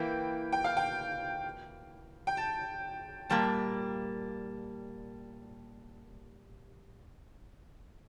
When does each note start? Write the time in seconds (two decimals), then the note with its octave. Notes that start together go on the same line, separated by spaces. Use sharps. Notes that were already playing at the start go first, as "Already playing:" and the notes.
Already playing: E3 A#3 E4 G5
0.52 G5
0.64 F5
0.77 G5
2.27 G5
2.37 A5
3.30 A#2 G3 A#3 A5